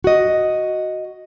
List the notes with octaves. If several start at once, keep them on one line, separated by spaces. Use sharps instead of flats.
F#4 D#5